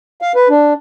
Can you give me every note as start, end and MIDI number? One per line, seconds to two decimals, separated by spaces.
0.22 0.32 77
0.35 0.48 71
0.50 0.73 62